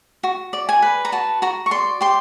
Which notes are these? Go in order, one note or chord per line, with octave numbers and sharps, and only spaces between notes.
F#4
D5
G#5
B4
A#5
F#4 A5
F#4 A#5
C#6
D5 C6
G4 C6